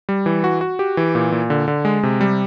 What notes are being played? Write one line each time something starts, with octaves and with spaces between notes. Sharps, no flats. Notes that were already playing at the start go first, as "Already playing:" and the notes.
G3
E3
F#4
F#4
G4
E3
A#2
A#2
D3
D3
G#3
C3
G3